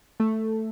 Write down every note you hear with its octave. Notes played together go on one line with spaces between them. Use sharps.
A3